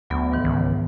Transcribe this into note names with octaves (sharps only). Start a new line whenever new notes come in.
D2 F#3 B3
G#2 D#3 E3
C#2